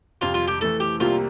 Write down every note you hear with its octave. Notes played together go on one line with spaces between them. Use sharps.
F2 C3 G3 F4
F4
G4
E3 A3 E4 A4
G4
C2 C3 G3 A#3 F4